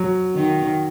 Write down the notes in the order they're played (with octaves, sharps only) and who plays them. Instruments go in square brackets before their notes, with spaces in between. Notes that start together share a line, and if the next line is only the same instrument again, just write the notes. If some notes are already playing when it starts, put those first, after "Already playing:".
Already playing: [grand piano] F#3
[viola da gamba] D#3